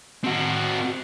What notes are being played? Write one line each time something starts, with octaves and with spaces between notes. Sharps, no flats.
C4 F#4